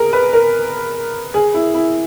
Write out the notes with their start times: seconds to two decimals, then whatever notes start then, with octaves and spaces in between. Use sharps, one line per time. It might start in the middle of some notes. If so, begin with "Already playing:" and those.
Already playing: G#4 A#4
0.13 B4
0.33 A#4
1.34 G#4
1.54 E4
1.75 E4